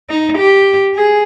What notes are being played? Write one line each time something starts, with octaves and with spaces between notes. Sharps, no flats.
D#4
G4
G#4